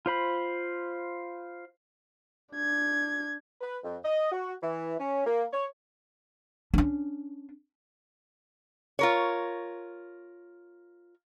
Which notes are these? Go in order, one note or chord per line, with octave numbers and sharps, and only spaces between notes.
F4 C5 B5
D4 G#6
B4
F2
D#5
F#4
E3
C#4
A#3
C#5
C#4 D4
F4 A#4 C#5